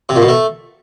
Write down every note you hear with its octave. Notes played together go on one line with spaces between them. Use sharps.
C3
A#2
B2
A3